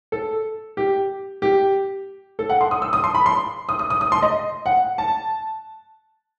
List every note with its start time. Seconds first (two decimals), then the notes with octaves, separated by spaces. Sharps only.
0.12 A4
0.77 G4
1.42 G4
2.39 A4
2.50 F#5
2.61 C6
2.71 D#6
2.82 E6
2.93 D#6
3.04 C6
3.15 B5
3.26 C6
3.69 D#6
3.79 D#6
3.90 D#6
4.01 D#6
4.12 C6
4.22 D#5
4.66 F#5
4.98 A5